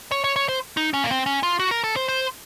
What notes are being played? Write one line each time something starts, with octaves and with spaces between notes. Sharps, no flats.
C#5
C#5
C#5
C5
D#4
C#4
A#3
C4
C#4
F4
F#4
A#4
A4
C5
C5